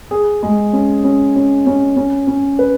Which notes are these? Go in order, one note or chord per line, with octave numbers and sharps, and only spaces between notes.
G#4
G#3
C#4
C#4
C#4
C#4
C#4
C#4
B4